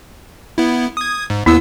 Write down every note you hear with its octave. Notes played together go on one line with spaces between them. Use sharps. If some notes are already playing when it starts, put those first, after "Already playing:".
B3 E4
D#6 G#6
G#2
D#2 B3 E4 E6